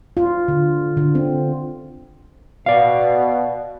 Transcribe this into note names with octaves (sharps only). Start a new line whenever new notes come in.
F4
D3
D3
C4
B2 D5 F5